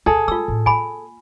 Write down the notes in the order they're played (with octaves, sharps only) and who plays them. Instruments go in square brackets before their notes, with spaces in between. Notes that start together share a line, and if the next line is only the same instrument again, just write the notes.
[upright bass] D2 B2 [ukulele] G#4 A4
[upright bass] G3 [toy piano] F4 E6
[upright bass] A2 D#3
[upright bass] A#3 [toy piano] G#5 B5